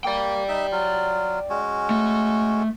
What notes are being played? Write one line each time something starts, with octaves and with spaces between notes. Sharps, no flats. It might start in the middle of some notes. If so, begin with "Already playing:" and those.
A#3 D5 G5
D#4 E5
F#3 F4
G#3 C#4 F#4
A3